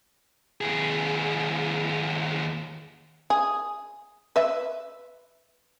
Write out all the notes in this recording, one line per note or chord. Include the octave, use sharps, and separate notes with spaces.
D#2 G#4
G#4
B4 E5